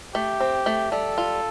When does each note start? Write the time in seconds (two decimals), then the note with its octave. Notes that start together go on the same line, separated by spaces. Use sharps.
0.14 A3 G4
0.40 C4
0.66 A3
0.92 G3 A4
1.18 F4